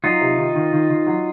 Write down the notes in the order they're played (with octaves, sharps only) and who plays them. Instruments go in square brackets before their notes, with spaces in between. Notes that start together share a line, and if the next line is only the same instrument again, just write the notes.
[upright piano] F#3 [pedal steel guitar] D#4 F4
[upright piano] C3
D#3
D#3
D#3
D#3
F#3